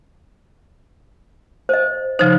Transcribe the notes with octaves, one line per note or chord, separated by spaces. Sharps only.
C5 D#5
C#3 F3 D#4 C5